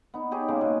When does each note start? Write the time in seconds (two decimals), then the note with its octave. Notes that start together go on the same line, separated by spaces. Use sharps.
0.14 B3 D#4
0.31 D#4 G4 G#4 C#5
0.48 C#3 G#3 A#3
0.61 B2